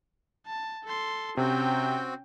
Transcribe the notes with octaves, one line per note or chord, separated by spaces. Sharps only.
A5
A4 C6
C3 C4 C#4 F#4 G5